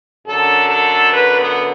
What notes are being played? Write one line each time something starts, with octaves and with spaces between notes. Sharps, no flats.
F#2 D3 A4
A4
B4
B3